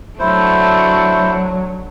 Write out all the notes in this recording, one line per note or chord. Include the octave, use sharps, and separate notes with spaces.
F#3 A3 D4 E4 F#4 C5